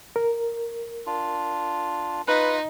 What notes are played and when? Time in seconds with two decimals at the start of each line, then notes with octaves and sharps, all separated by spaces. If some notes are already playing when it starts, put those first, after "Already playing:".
0.16 A#4
1.06 D4 F4
2.28 D#4 F4 B4